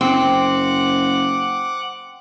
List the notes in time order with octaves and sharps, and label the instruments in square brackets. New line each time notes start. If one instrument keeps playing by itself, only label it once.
[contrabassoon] F#1 [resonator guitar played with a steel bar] C4 [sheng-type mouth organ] F#5 D6